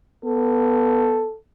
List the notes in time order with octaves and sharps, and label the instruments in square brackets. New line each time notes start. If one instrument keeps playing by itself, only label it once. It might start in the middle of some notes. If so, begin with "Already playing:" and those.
[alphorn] B3 [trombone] A4